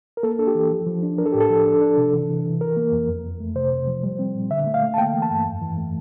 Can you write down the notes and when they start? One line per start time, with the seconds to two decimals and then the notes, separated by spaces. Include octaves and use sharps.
0.17 A#4
0.23 A#3 A4
0.39 D4 A4
0.47 G4
0.55 E3
0.71 F3
0.86 F3
1.03 D4
1.18 D4 A#4
1.26 A4
1.33 A2 G4
1.40 A4
1.50 F3
1.66 D4
1.81 D4
1.97 C3
2.14 E3
2.29 E3
2.45 E3
2.61 E3 A#4
2.77 A#3
2.92 F2
3.08 F2
3.24 F2
3.40 A3
3.55 C3 C5
3.72 C3
3.88 F3
4.03 G3
4.19 C4
4.35 A#2
4.50 D3 E5
4.67 A3
4.74 F5
4.83 A3
4.94 A5
4.98 A#3 G5
5.14 E3
5.22 A5
5.30 G2
5.46 F2
5.62 E3
5.77 A3